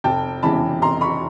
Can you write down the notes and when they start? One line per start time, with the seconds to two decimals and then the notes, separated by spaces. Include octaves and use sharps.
0.04 F1 G5 A5
0.43 E2 C#3 E3 G#3 A5 B5
0.81 F1 A#5 C6
1.01 B5 C#6